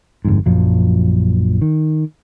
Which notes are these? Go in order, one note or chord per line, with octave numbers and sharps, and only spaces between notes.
G1 F2 G#2
A#1 F#2 F3 F#3
D#3